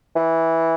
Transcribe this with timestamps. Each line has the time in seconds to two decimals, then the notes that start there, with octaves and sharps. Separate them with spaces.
0.16 E3